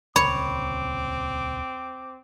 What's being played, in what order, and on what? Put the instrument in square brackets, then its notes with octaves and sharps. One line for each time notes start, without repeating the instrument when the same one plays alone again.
[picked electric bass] D#1 C#2 [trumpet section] C4 D6 [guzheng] C#5 [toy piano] B5